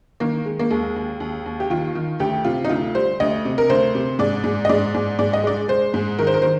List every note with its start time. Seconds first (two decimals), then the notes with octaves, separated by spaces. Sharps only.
0.20 D#3 A#3
0.46 G#3
0.59 A#3
0.70 D#2 G#3
0.96 D#2
1.20 D#2
1.46 D#2
1.60 G4
1.70 D#3 F4
1.95 D#3
2.20 D2 G4
2.45 C3 F4
2.65 D#4
2.69 D2 F4
2.95 G3 C5
3.20 D2 D#5
3.45 C3
3.58 A#4
3.69 D2 C5
3.95 C3
4.19 G#2 D5
4.44 G#2
4.65 D#5
4.69 G#2 D5
4.94 G#2
5.19 G#2 D5
5.33 D#5
5.44 G#3 D5
5.68 G#3 C5
5.94 G#2
6.19 D#3 A#4
6.27 C5
6.34 A#4
6.42 D#3 C5